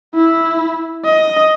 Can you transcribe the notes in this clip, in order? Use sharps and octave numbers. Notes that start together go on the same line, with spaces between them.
E4
D#5